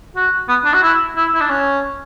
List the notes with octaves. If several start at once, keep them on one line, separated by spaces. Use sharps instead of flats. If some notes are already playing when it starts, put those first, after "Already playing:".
F#4
B3
D4
F#4
E4
E4
E4
D4
C#4